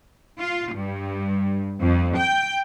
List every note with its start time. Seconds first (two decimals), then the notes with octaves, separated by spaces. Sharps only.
0.39 F4
0.74 G2
1.81 F2
2.17 G5